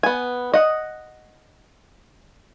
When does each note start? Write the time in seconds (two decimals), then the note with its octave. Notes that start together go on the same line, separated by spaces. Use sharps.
0.03 B3 G#5
0.54 D#5 F#5